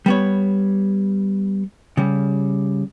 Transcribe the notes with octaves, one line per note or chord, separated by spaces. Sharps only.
G3 B3 C#5
C#3 G3